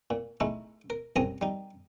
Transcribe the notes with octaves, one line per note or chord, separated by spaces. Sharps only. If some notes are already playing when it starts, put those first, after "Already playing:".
A#2
G#3 A3 D#4 E4
A#4
C2 F#2 C4 G#4 A#5 D#6
G3 D#4